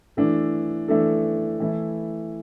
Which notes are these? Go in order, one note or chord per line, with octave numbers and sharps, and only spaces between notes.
E3 A3 D4 A4
E3 A3 D4 A4
E3 A3 E4